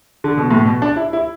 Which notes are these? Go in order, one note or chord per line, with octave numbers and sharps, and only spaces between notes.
D3
B2
A2
B2
D4
E4
E4